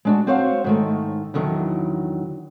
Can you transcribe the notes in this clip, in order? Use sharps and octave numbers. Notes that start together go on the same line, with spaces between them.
G#3 D4 F#4
C4 F#4 C5 C#5 F5 F#5
G#2 D#3 A3
E2 D3 D#3 F#3